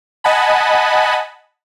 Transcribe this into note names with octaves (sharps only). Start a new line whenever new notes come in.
D#5 F#5 G#5 A5 B5